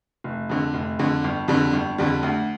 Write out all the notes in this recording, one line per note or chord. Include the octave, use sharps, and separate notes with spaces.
F1
F2 D3
F1
F2 D3
G1
F2 D3 G3
G1
F2 D3 G3
D2